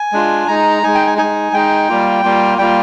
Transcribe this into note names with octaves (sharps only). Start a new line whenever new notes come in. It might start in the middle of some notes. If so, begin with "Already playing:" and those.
Already playing: G#5
G#3 D4 F4
G#3 D#4 A#5
G#3 D#4 G#5
G5
G#5
G#3 D#4 G#5
G#3 D#4 G5
G3 A#3 F4
G3 A#3 F4
G3 A#3 F4 G5